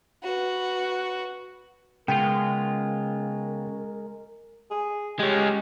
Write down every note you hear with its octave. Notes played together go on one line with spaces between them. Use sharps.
F#4 B4
C#3 G#3 B3 F4 A#4 G5
G#4
G#3 C#4 G4